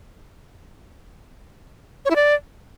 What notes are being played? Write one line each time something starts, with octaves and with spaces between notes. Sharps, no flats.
C#5
E4
D5